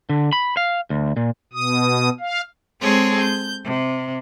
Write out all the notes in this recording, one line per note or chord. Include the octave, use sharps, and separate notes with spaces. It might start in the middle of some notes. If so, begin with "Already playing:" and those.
D3
B5
F5
D2
A#2
B2 D#6
F5
G#3 C4 G#4 A4 C#5
G6
C3